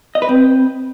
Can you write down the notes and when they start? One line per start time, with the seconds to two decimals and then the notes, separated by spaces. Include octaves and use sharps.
0.15 D#5
0.22 B4
0.29 C4